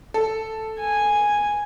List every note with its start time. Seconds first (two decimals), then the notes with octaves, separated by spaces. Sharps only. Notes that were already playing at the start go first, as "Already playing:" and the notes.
0.14 A4
0.79 G#5